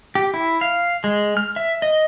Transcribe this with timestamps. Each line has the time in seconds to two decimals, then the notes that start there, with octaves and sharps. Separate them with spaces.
0.15 G4
0.34 E4
0.61 F5
1.04 G#3
1.37 F6
1.56 E5
1.82 D#5